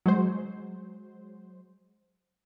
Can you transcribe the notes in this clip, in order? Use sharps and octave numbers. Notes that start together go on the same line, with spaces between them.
F#3 G#3 C5